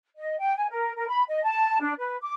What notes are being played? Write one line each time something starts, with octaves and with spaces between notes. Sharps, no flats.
D#5
G5
G#5
A#4
A#4
B5
D#5
A5
D4
B4
D6